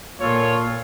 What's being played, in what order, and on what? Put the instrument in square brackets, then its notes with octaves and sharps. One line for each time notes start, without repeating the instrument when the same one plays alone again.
[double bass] A#2 [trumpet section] F4 A4 C#5